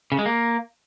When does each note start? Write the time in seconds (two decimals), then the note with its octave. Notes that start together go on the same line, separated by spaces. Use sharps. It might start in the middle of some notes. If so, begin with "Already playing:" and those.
0.12 C#3
0.19 G#3
0.26 A#3